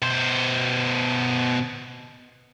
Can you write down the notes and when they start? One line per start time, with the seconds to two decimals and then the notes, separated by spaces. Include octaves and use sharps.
0.02 B2 C5